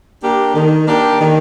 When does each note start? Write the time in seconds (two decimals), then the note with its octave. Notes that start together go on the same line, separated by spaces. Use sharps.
0.22 A#3 D4 G4
0.55 D#3
0.88 A#3 D4 G4
1.20 D#3